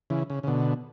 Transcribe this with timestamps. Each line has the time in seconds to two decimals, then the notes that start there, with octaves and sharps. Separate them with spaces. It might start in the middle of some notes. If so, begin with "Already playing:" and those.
0.10 C#3 E3
0.30 C#3
0.43 C#3
0.47 B2 D3